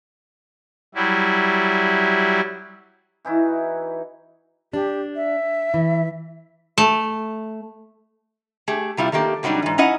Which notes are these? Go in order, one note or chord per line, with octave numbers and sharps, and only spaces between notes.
F#3 G3 E4
E3 D#4 E4 F#4
D4 G4
E5
E3
A3
A3 G4 G#4
C3 G3 E4 F4
D#3 A3 A#3 G4
C3 F#3 G3 D4 D#4
G#2 E3
C#4 D#4 E4 D#5 F#5